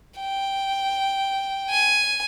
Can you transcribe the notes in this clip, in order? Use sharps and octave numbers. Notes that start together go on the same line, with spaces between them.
G5
G#5